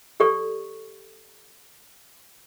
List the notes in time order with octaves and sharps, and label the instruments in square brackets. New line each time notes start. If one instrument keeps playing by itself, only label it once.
[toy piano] G4 A4 D5 C#6